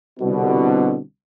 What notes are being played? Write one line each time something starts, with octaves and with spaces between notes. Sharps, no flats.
C2 B2 D3